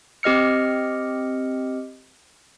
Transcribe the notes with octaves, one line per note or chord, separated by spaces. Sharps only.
C4 G4 D#5 F6 C#7